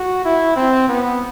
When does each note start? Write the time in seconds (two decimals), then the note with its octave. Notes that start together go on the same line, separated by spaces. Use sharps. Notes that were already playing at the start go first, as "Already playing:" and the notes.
Already playing: F#4
0.25 E4
0.56 C4
0.88 B3